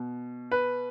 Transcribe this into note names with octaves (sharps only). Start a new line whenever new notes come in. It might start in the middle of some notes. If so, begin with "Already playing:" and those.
Already playing: B2
B4